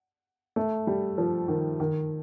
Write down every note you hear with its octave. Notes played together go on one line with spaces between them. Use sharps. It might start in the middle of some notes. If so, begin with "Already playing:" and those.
A3
G3
F3
D#3
D#3